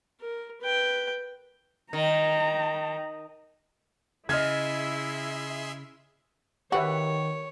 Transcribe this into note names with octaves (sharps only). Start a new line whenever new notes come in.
A#4
B4 G5
D#3 G5 A#5
C#3 E4 G#4 D#5 E5 C6 F6 G#6
D#3 F#4 G4 B4 C#5 E5